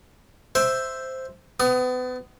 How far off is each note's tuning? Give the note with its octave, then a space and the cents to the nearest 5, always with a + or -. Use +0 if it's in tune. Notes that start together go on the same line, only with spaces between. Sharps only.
C5 +0 E5 +0
B3 +35 D#6 +0